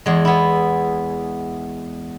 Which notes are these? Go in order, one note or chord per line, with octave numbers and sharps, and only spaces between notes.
E2 G#3
B3 E4